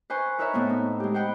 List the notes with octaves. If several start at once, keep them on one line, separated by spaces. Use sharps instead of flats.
B4 C5 G#5 C#6 F#6
D#4 E4 A#4 B4 C#5 E5
A2 B3 C4
D#4
G#3 G4
C5 F#5 G5 B5